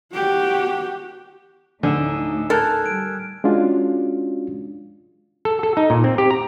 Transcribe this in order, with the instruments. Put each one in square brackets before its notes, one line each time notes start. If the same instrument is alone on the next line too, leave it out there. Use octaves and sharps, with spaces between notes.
[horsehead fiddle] F#4 G4
[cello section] D2 A2 D#4 [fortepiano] D3 [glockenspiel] G#5 E6 E7
[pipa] A4 A#4 [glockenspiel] F6 F#6 G#6
[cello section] G3 [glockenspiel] D7
[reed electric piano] G#3 C#4 D4 F4 F#4
[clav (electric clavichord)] A4
A4
D#4
A#2
C4
G4
A#5